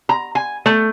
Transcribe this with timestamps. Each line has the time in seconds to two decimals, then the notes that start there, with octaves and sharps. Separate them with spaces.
0.09 A#5
0.35 G#5
0.66 A3